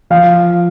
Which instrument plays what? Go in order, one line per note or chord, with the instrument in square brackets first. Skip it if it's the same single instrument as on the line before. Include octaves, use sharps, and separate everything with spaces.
[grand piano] F3 F5